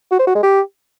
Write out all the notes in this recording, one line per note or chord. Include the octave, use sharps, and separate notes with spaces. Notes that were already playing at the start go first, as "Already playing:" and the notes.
F#4
C5
F#4
G#3
G4